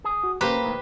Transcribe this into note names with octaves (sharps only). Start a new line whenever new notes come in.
G#4
F#4
C#3 F#3 A#3 G4 B4 C5 A#5
B1 A2 D#3